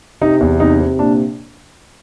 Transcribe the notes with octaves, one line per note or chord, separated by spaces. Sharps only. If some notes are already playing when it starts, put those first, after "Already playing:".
C3 D#4
E2
C3 D#4
C3
A#2 D4